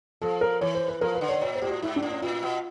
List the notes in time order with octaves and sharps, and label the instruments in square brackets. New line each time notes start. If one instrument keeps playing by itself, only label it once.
[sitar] F3 [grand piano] A4
[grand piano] A#4
[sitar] E3 [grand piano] C#5
[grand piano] C5
B4
[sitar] F3 [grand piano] A#4
[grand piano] B4
[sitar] D3
[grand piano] C#5
[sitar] A#2 [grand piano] C#5
[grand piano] C5
[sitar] A2 [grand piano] G4
[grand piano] F#4
[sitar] G#2 [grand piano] E4
[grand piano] D4
[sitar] A2
[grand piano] C#4
[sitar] A#2 [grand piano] F4
[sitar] B2